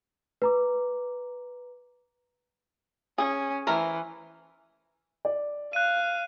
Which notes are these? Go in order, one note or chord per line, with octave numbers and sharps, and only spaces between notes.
B4 A#5 D6
C#4 G#4
E3 A3 A#4 C5
D5
F5 F#6 D#7